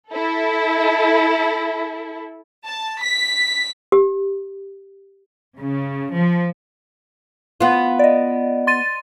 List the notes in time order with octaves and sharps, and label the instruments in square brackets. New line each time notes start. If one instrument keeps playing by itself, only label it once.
[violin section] E4 A4
A5
B6
[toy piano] G4
[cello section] C#3
F3
[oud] B3 F4
[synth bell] D5 D#5
C6 A6 D#7